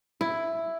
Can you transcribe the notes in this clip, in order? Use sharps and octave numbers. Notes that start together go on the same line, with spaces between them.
E4